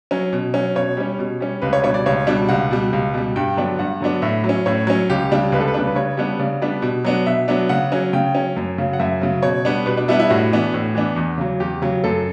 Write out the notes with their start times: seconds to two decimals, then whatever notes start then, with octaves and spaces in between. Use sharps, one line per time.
0.11 F#3 C#4
0.33 B2
0.54 F#3 C#4
0.75 B2 C#5
0.97 G3 C#4
1.19 B2
1.40 G3 C#4
1.62 C#2 B4
1.73 C#5
1.83 B2 G3 D4 C#5
1.94 D5
2.06 C#2 C#5
2.27 B2 G3 D4
2.49 C#2 F#5
2.71 B2 G3
2.93 C#2
3.14 B2 G3
3.36 G2 G5
3.57 D3 F#3 B3 D4
3.79 G2 F#5
4.01 D3 F#3 B3 D4
4.22 A2 E5
4.44 F#3
4.49 C#4
4.66 A2 C#5
4.87 F#3 C#4
5.09 C#2 G4
5.31 C#3 G3 D4
5.52 C#2 B4
5.60 A4
5.68 B4
5.74 C#3 G3 D4
5.87 B4
5.95 C#3 C#5
6.17 G3 B3 D4
6.39 C#3 D5
6.62 G3 B3 D4
6.82 B2
7.05 F#3 B3 D4
7.26 B2 E5
7.48 F#3 B3 D4
7.69 C#3 F#5
7.92 F#3 C#4
8.13 C#3 G5
8.35 F#3 C#4
8.56 F#2
8.78 C#3 F#3
8.93 F#5
9.00 F#2 E5
9.21 C#3 F#3
9.42 B2 C#5
9.65 G3 B3 D4
9.86 B2 B4
9.97 D4
10.08 G3 B3 D4 E4
10.20 E4
10.29 A2 F#4
10.52 E3 B3 D4
10.74 A2
10.94 E3 B3 D4
11.16 E2
11.38 C#3 F#3
11.60 E2 G4
11.82 C#3 F#3
12.04 F#2 A4